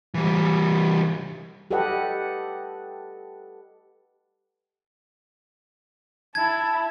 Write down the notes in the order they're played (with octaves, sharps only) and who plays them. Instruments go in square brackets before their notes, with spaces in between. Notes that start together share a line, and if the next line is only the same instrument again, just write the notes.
[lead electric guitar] E3 G3
[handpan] G4 A4 B4 D#5 F#5
[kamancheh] E4 A5 [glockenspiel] G#6